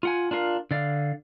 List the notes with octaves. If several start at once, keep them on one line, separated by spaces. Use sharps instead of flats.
F4 F#5 G#5
D4 F4 A#4 F5
D3 D5 F5